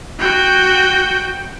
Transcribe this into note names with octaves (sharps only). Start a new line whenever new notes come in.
F#4 G5